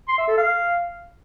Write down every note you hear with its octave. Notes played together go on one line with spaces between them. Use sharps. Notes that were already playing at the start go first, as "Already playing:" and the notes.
C6
E5
A4
F5